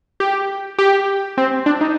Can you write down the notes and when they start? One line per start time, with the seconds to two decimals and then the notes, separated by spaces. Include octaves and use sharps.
0.20 G4
0.78 G4
1.38 C4
1.66 D4
1.81 D#4